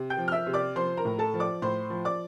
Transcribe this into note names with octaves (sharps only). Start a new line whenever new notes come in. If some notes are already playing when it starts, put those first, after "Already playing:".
Already playing: C3
G5 G6
F3
F6
E5 E6
C3
D5 D6
F3 C5 C6
A#4 A#5
A2
A4 A5
F3
D5 D6
A2 C5 C6
F3
D5 D6